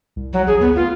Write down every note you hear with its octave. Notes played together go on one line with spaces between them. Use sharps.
C2
F#3
A1 G#4
D2 B3
F4